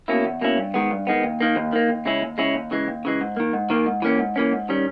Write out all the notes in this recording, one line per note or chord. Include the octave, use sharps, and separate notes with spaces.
B2 A#3 C#4 E4
E2
B2 A#3 C#4 E4
G2
D#3 G#3 B3
G2
D#3 G#3 B3
D#2
D#3 A#3
D#2
D#3 A#3
D#2
C#3 G#3 C#4 E4
D#2
C#3 G#3 C#4 E4
D#2
C#3 E3 G#3
D#2
C#3 E3 G#3
G#2
D#3 A#3
G#2
D#3 A#3
G#2
E3 A#3 C#4
G#2
E3 A#3 C#4
G#2
D#3 G3 C#4